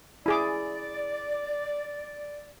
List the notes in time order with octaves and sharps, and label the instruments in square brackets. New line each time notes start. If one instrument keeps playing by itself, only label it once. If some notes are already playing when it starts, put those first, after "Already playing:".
[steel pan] E4 G#4 D6 [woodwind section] D5